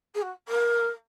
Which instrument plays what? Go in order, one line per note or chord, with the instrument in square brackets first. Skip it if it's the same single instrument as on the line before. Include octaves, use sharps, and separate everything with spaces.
[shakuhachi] G#4
F#4
A#4